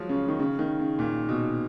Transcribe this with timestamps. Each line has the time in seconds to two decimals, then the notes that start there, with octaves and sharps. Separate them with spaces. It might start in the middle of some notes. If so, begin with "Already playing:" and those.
Already playing: F3 F#3 G#3
0.09 C#3
0.28 D#3
0.39 C#3
0.59 D#3
0.79 C#3
0.99 A#2
1.29 B2